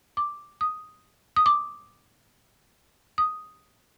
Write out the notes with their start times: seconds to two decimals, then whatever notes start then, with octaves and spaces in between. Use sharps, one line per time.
0.17 D6
0.61 D#6
1.36 D#6
1.46 D6
3.18 D#6